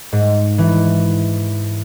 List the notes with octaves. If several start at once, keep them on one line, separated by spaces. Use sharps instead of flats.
G#2
E3